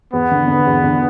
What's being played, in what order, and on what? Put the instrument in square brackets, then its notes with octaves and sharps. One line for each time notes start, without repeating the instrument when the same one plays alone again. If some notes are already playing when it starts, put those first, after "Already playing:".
[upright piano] E2 [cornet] B3
[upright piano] D3
D3
E2
D3